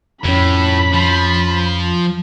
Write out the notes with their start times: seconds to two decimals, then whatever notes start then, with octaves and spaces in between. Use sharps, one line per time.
0.25 F2 A2 C#4 B5
0.94 F3